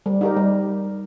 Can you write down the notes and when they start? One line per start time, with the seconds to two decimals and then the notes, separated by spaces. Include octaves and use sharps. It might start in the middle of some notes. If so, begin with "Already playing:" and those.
0.06 G3
0.21 D#4 G4 A#4
0.37 G3